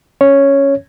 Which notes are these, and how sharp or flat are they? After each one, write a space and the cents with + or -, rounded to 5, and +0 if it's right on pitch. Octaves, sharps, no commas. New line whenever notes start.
C#4 +0 C#5 +0